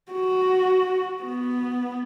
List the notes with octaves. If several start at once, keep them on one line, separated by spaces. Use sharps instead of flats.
F#4
B3